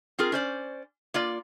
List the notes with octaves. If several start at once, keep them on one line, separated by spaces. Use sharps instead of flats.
C4 F4 G#4 A#4
C#4 C5 D5
A#3 F4 D5